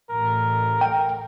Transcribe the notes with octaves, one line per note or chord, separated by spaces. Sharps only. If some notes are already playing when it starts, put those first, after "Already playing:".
A1 A#4
G5